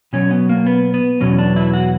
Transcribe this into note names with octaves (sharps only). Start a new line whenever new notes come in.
B2 F#3 C#4
B3
A#3
B3
B3
E2 B2 F#3 C#4
D4
E4
F#4